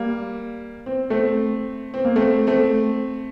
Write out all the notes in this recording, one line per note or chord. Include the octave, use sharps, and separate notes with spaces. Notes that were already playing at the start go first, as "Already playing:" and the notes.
Already playing: G3 A#3
C4
A3 C4
C4
A#3
A3 C4
A3 C4